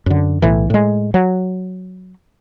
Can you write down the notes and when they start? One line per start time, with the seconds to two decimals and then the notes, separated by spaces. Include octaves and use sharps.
0.06 F#2 D3
0.42 B1 A2 E3
0.70 A2 G#3
1.14 F#3